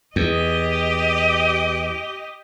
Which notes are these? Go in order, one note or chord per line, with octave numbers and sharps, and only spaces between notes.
E2 G4 D#5